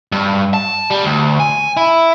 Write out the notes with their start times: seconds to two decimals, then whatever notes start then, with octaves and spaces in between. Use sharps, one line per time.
0.12 G2
0.54 A5
0.91 G3
1.05 D2
1.40 G#5
1.77 E4